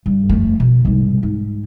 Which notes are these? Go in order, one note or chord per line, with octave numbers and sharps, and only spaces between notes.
G2
F2 A3
B2
C2 G#2
G#2